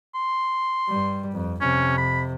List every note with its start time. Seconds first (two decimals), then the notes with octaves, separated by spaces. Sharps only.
0.15 C6
0.89 G2 G3
1.32 F2
1.61 F2 C3 C#4
1.97 B5